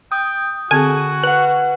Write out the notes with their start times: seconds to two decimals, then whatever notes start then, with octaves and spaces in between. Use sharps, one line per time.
0.12 G5 D#6
0.71 D3 C4 F#4 G#4 G#5
1.23 B4 F#5 F#6